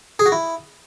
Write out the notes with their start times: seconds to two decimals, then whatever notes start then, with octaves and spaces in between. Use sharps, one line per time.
0.19 G#4
0.26 F#4
0.32 E4